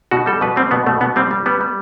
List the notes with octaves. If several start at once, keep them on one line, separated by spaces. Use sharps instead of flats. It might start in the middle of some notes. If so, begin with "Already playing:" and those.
B2 F#4
G3 A4
B2 B4
G3 C4
B2 B3
B2 A3
B2 B3
G3 C4
G3
G3 B3
G3